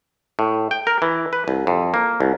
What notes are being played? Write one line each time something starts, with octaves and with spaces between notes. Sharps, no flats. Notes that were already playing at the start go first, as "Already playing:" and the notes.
A2
G5
A#4
E3
B4
C2
F2
A#3
C2